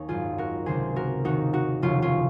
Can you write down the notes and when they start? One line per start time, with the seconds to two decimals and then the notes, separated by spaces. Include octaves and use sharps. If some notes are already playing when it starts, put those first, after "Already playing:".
Already playing: D#2 C#4 D#4
0.08 G#1 F#2 D#3 F4 G#4
0.38 F#4 A#4
0.66 C#2 C3 D#3 G#4 C5
0.96 F#4 A#4
1.24 D#2 D#3 D#4 F#4
1.53 D#4 F#4
1.82 F1 D#2 C#3 C#4 F4
2.02 C#4 F4